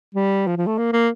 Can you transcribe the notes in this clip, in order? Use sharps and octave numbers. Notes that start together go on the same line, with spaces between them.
G3
F3
F3
A3
A#3
A#3